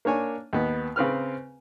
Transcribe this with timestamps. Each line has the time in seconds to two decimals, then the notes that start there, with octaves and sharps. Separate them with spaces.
0.05 A#3 D4 C#5 G#5
0.53 D#2 B3
0.96 C#3 C4 B4 F6